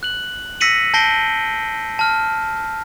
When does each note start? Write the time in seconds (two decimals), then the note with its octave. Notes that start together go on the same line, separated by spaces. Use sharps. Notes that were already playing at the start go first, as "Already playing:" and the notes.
0.03 F#6 F#7
0.60 E6 A#6 B6 C#7 D#7 F#7
0.94 A5 G6 A#6 C7 D7 G7
1.99 A5 F6